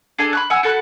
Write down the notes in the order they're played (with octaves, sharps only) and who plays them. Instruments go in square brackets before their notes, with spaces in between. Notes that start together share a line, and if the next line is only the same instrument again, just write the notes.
[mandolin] D4 G#4 A4 G#5
B5 C#6 F#6
F#5 G#5 E6
F#4 A4 B5 F#6